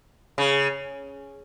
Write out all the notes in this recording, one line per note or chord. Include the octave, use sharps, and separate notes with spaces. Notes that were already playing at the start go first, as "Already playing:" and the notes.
C#3